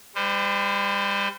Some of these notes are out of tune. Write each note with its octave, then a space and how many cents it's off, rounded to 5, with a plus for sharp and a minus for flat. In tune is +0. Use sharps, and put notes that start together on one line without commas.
G3 +30 C5 -30